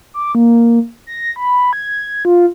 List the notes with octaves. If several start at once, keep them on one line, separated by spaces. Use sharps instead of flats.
D6
A#3
A#6
B5
G#6
F4